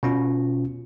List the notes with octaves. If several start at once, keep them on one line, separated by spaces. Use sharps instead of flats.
B2 C#4 F4